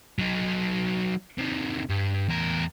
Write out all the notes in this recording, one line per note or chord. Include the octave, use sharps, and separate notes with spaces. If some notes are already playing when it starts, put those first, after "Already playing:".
F#3 D#4
C3 D#3
G2
E2 A#4